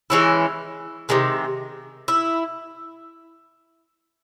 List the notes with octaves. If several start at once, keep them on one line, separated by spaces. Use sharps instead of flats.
E3 G#3 C#4 E4
C3 D#3 G#3
E4